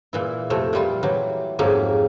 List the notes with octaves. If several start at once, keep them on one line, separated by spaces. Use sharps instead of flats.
A#2 E3 E4
F2 C3 A3
A#2 E3 G3 F4 C6
E3 F#3 G4
F2 G#2 F#3 A#3 G4 G#5